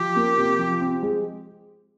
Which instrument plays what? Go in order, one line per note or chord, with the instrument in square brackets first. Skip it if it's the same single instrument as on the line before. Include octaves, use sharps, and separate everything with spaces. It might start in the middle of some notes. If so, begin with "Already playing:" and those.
Already playing: [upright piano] F3 [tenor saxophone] G4
[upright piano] A#3
C3
F3
C4
G#3